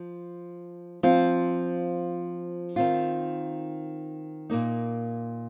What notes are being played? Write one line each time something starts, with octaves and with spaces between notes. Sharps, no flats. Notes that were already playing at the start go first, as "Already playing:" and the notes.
Already playing: F3
F3 C4 F4
D#3 C4 F4
A#2 A#3 D#4